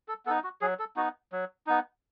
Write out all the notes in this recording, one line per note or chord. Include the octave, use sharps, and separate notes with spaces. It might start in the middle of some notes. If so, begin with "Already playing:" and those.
A4
B3 D#4 A4
F#4
F#3 G#4
A4
B3 D#4 F#4
F#3
B3 D#4